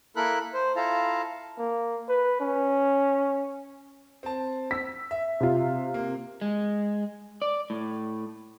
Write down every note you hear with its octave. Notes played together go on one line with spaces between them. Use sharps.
A#3 E4 A4 A#4 B5 F#6
C5
E4 F4 A4 F5 A5 A#5
A#3
B4
C#4
C4 A5
E6 B6
E5
C3 F4
A#3
G#3
D5
A2